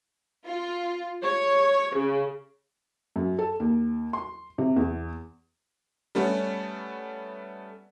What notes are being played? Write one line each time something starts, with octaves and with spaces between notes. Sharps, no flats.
F4
C#5
C#3
F#2
A4
D#2
C6
C3
E2
G3 A3 B3 C#4